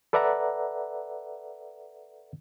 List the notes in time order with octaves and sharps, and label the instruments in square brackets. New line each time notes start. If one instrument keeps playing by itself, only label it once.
[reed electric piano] A4 B4 D5 E5 F#5 A#5